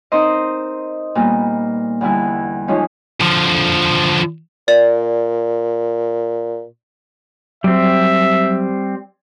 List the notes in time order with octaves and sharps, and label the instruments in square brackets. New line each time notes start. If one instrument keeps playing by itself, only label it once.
[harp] C4 D#4 A#4 C5 D#5
A#2 G3 B3
E2 D3 G3 E4
E3 F3 G#3 C#4 D#4
[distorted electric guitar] D3 F3
[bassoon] A#2 [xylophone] D5
[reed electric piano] F#3 [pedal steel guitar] G3 C4 [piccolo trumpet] E5